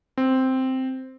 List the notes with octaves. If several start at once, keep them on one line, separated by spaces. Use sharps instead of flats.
C4